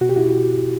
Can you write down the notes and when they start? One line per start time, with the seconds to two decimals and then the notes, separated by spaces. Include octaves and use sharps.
0.01 B2 F#4
0.09 G4
0.16 E4 F#4